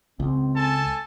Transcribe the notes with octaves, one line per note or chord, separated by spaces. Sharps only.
C#2 C4
A4 G#5 A5